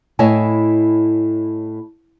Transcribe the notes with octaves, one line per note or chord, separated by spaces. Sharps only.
A2 E4 C#5 D#5 G#5 A5